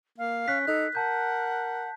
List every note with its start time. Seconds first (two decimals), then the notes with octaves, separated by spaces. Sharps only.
0.18 A#3 F5
0.48 C#4 F#6 B6
0.67 D#4 A4 F#6
0.95 A#4 F#5 A5 G6